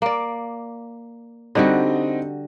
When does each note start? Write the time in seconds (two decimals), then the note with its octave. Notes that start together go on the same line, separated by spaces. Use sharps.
0.02 A#3 D5
1.55 D3 G3 C4 D#4 F#4 D#5